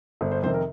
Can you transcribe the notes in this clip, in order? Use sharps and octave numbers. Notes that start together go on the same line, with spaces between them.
G1 C5
C5
F2 C3 D#3 C5
A#4